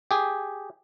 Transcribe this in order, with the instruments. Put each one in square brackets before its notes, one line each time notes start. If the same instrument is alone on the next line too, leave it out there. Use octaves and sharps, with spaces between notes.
[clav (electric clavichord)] G4 G#4